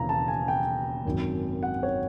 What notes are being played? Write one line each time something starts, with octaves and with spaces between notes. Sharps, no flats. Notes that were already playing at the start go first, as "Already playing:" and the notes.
Already playing: E1 D#2 C#3 E3 A#5
A5
G#5
G5
G#1 F#2 D#3
F#5
C#5